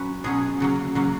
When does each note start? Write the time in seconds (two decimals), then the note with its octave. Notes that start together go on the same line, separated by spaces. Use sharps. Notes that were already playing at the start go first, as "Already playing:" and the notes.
Already playing: F#3 C#4 B4
0.24 B2 F#3 C#4 G#4
0.60 C#3 F#3 A#3
0.95 C#3 F#3 A#3